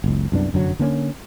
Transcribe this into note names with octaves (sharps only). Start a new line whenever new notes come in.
F#1 C#2
C2 F#2 B3 D4
F1 F#2 D3 F#3
D3 A#3 C4 C#4